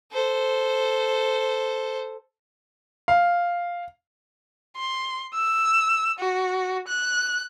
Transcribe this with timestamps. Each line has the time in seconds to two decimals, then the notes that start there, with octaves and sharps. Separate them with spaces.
0.12 A4 C5
3.08 F5
4.77 C6
5.34 E6
6.19 F#4
6.88 F#6